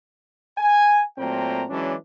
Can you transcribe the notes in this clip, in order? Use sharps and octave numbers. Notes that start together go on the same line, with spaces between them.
G#5
A#2 F#3 A3 C4 G5 A#5
E3 F#3 G#3 C#4 D4